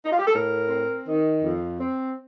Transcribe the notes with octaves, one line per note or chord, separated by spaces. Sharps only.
D#4
F4
G4
A4
A2 A#4
C4
D#3
F2
C4